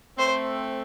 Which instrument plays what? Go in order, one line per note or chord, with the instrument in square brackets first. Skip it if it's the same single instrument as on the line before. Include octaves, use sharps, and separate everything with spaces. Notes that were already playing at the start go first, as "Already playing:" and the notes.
[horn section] A3 C4 [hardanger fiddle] C5